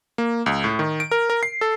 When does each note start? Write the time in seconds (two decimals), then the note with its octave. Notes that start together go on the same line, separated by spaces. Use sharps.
0.18 A#3
0.46 C#2
0.64 A2
0.79 D#3
1.00 D7
1.11 A#4
1.30 A#4
1.43 C7
1.61 A4